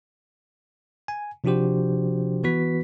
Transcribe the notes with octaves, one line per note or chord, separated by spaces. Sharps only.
G#5
C3 F3 D4 F#4 G4 C5
E3 B3 F#4 B4 B6